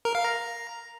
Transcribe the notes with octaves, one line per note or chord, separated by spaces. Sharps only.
A#4
F5
A#5